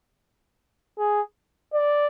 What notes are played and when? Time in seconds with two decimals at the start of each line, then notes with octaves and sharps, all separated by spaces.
0.99 G#4
1.74 D5